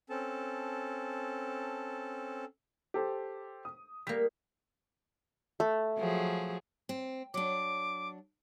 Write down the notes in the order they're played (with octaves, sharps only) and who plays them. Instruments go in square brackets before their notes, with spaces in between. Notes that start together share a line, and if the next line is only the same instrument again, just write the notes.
[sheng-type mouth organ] C4 C#4 A4 A5
[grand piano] G4 A4 C5
D#6
[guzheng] G3 A#3 [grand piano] B6
[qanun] A3
[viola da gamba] F3 F#3 G#4
[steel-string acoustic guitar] C4
[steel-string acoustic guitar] F#3 D4 [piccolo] D6